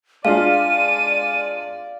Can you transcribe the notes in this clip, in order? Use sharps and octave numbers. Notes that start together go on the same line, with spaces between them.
G#3 D4 F4 D5 F5 D#7